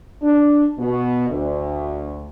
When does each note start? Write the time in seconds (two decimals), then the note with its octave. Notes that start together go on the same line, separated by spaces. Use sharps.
0.22 D4
0.79 B2
1.28 D2